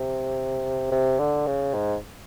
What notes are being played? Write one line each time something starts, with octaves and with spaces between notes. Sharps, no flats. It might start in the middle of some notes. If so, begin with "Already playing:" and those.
Already playing: C3
C3
D3
C#3
G#2